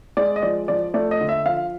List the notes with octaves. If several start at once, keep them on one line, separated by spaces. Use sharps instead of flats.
G#3 D5
D#5
F3 D5
F3 D5
A3 D5
D#5
D3
E5
F3 F5